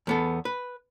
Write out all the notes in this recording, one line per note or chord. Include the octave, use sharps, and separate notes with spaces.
E2 B3 A4
B4